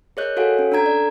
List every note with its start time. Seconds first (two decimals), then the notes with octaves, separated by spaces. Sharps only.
0.17 G#4 A#4 C#5 D#5 F#6 G6
0.37 F#4 A4 C#5 F5 F#5 G#5
0.59 C#4
0.72 D4 A4 A#5 G#6
0.86 D5